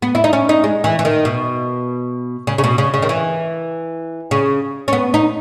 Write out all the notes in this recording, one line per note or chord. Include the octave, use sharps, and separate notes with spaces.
B3
E4
D#4
C#4
D#4
G#3
E3
E3
D#3
B2
C#3
C#3
B2
C#3
C#3
D#3
E3
C#3
C#4
B3
D#4